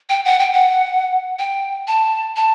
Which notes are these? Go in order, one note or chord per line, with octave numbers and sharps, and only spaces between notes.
G5
F#5
G5
F#5
G5
A5
A5